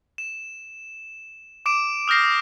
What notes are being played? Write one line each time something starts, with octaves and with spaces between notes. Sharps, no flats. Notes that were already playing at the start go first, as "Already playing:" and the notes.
E7
D6 D7 E7
D#6 F6 G6 A#6 C7